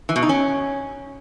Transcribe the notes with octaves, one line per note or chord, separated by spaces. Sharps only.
E3
B2
D#4
C#4